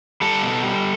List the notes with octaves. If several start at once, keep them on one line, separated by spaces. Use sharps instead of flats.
G3 A4
B2
G3